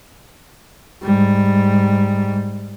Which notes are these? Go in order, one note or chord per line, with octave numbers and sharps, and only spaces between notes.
G#2 G3